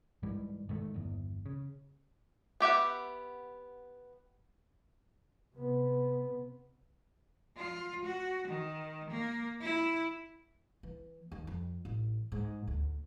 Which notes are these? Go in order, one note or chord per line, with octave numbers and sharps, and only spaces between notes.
G#2 E3 G3
G#2 D#3 A3
G1 E2
C#3
B3 G4 E5 F#5
C3 B3
F4
F#4
D#3
A#3
E4
E3
D#2
F2
A1
G#2
D2